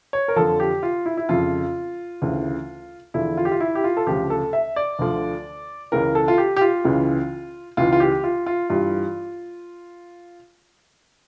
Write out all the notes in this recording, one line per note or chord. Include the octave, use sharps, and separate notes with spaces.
C#5
A#4
F2 D3 F3 A4
G4
F4
E4
E4
F2 C#3 F3 F4
D2 C#3 E3
E2 D3 F3 E4
F4
G4
F4
E4
G4
F4
A4
D2 C#3 F3 G4
A4
E5
D5
D2 D3 F3
C#2 C#3 E3 A#4
A4
F4
G4
G4
F4
C#2 C#3 E3
C#2 C#3 E3 F4
F4
G4
F4
F4
G2 E3 F4